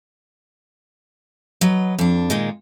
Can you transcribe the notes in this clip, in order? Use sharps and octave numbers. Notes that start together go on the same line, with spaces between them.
F#3 B4 D#5
F2 D4
A#2 D#3 G#3